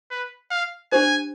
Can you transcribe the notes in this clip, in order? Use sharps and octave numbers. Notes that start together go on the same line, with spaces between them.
B4
F5
D4 G4 C5 G#5